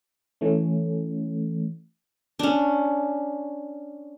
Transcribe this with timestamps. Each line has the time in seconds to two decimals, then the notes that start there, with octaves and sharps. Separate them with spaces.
0.41 E3 A3 C#4
2.39 C#4 D4